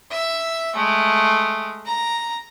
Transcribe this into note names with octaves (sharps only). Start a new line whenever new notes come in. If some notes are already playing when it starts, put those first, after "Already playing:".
E5
G#3 A3
A#5